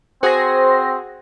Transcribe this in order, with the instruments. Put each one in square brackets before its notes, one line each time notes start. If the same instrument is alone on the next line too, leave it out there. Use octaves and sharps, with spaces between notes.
[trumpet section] C4 [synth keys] F#4 G#4 [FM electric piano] C5 C6 A#6